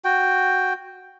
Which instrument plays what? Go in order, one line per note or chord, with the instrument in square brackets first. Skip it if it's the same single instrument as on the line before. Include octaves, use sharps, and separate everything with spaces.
[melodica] F#4 G5